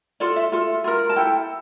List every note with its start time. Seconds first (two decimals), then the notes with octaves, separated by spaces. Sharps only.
0.20 F4 A4 D5
0.36 E5
0.52 F4 A4
0.84 F4 A#4
1.10 A5
1.16 E4 A4 G5